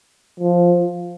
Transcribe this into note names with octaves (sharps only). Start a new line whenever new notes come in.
F3